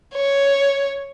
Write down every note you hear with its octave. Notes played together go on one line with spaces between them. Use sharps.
C#5